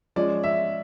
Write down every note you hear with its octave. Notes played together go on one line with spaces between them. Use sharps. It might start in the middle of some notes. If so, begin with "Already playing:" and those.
F3 G#3 C#4 D5
E5